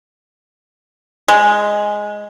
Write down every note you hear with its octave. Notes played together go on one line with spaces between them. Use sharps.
G#3